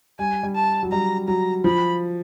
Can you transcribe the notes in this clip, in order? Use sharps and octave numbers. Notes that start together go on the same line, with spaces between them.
G3 G#5
G3
A5
F#3
G3 A#5
F#3 A#5
F3 B5